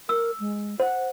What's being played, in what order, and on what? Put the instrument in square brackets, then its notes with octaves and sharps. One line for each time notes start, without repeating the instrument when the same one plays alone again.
[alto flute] A#4 [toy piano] E6
[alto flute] G#3
[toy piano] C5 [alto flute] F#5